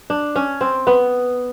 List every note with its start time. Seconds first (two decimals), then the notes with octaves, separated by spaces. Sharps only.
0.10 D4
0.36 C#4
0.61 C4
0.87 B3